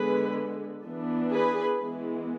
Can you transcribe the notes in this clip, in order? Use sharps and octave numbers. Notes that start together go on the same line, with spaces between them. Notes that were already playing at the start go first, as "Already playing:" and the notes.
Already playing: D3 G#3 B3 G#4 B4
E3 B3 D4
G#4 B4
E3 G#3 B3